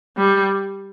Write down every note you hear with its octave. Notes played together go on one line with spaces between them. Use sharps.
G3